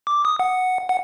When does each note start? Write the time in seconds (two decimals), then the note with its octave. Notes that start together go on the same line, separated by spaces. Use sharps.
0.07 D6
0.25 D#6
0.40 F#5
0.89 F#5